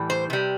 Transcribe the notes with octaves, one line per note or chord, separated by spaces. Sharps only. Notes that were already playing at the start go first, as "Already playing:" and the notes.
Already playing: A2 E3 G3
C5
C3 G3